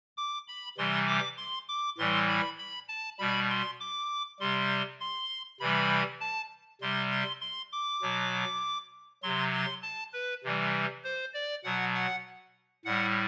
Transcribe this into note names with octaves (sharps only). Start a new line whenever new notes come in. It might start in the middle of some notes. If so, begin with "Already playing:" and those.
D6
B5
C3 E3 G3 C6
D6
C6
D6
A2 E3 G3 C6
B5
B5
A5
B2 G3 B5
C6
D6
C3 G3 C6
C6
C3 E3 G3 B5
A5
C3 G3 C6
C6
C6
D6
B2 F#3
C3 F#3 C6
C6
A5
B4
C3 E3 G3
C5
D5
B2 F#3 F#5
F#5
A2 G3 F#5